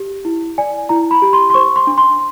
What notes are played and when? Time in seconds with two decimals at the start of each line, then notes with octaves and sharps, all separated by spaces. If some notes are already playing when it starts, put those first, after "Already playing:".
Already playing: G4
0.25 E4
0.58 D5 G#5
0.89 E4 A#5
1.11 B5
1.22 G4
1.33 C6
1.50 C6
1.54 C5 C#6
1.76 C6
1.87 D4
1.98 C6